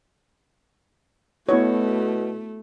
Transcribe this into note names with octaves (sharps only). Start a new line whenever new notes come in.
B2 A3 B3 E4 F#4 C#5